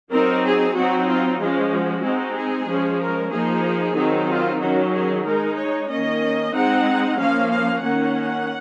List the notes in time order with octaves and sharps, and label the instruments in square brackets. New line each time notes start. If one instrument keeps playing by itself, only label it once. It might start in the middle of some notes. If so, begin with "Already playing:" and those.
[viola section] F#3 C4 D#4 A#4
G#4
F#3 C4 D#4 F#4
F4
F3 G#3 C#4 F4
F#4
G#3 C4 D#4
G#4
F3 G#3 C#4
A#4
F3 A#3 D#4 G#4
D#3 F#3 C4 D#4
F4
D#3 F#3 C#4 F#4
G#4
G#3 D#4 A#4
C#5
D#3 A#3 C#4 D#5
G#3 C4 D#4 F#5
F3 A#3 C#4 F5
F5
D#3 A#3 C#4 F#5